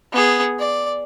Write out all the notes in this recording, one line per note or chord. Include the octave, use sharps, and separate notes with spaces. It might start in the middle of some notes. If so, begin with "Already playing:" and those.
B3 G#4
D5